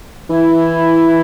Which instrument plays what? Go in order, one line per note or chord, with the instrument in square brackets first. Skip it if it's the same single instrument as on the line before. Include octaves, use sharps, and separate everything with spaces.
[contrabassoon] E3 [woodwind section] E4